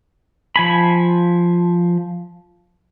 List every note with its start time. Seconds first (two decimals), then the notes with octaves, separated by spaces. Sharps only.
0.56 F3 G#5 B5